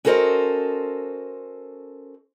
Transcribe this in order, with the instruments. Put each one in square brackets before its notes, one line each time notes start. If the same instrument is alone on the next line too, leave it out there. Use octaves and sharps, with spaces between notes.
[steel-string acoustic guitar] C#4 F#4 A4 A#4 C5 D#5